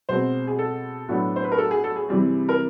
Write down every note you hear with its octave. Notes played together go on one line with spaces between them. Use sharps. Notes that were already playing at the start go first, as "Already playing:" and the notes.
B2 G#3 C4 C5
G#4
A4
A2 F#3 B3 D4
C5
B4
A#4
A4
G#4
A4
G#4
C3 E3 G3 C4
A#4